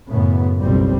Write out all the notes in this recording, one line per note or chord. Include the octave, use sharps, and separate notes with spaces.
F#2 A2 C#3 B3
F#1 B1 B2 F3 G3 C4